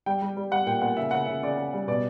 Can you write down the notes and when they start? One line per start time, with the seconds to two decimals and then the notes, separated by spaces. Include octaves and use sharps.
0.06 G3 G5
0.22 G3
0.37 G3
0.51 G3 F#5
0.66 A#2 G5
0.82 A#2 F#5
0.97 C#3 E5
1.11 C#3 F#5
1.25 C#3 E5
1.43 C#3 D5
1.57 C#3
1.73 G3
1.88 B2 D5